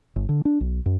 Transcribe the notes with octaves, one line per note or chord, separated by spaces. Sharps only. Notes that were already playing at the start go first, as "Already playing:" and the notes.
G1
D3
D4
B1
F#2